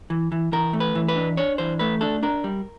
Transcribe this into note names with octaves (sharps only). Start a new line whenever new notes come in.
E3
E3
E3 A#4
A3
B4
E3
B4
D4
D4 C#5
E3 C5
A3 B4
D4 A4
D4 A#4
G3